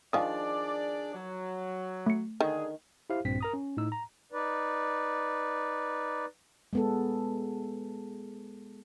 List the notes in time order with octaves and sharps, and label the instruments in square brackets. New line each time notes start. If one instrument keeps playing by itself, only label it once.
[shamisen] D#3 F3 [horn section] D4 G#4 D5 [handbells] F5 G#5 D#6
[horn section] F#3
[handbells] A3 C#7
[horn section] D3 G#4 [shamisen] D#3
[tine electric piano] E4 G4 C5 F5
A#1 G2 A#2 C4 B6
A#4 A#5 D#6
C#4
A2 D#4 E6
A#5
[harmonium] D#4 B4 D5
[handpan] G#3 B3 A4